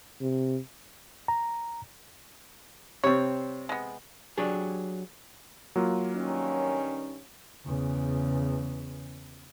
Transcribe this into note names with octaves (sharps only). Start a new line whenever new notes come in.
C3
A#5
C3 G3 C4 C#5
G#3 B3
F#3 D4 G4 G#4
F#3 A#3 F4
G2 D#3 C#4
E2 C#3